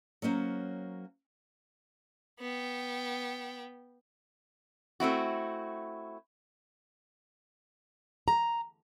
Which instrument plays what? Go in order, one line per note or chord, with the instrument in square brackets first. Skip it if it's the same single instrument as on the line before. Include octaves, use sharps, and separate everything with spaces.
[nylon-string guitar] F#3 A#3 C#4 C5
[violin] B3 G5
[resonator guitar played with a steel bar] A3 C4 E4 F#4
[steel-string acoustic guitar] A#5